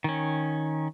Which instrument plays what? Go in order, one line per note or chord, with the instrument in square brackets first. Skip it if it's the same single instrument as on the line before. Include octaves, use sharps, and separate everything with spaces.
[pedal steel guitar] D#3 C#4